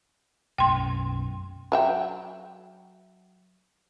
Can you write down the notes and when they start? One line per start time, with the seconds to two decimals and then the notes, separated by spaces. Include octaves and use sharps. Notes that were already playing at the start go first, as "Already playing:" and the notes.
0.58 B1 F#2 A#3 G5 C6
1.72 F#3 E5 G5